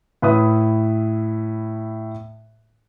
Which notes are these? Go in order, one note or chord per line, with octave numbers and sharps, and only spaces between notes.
A2 B4 E5 D#6